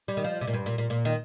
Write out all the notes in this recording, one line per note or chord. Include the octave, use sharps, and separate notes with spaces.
G3
D#3
F3
C3
A#2
G2
A#2
A#2
A#2
D#3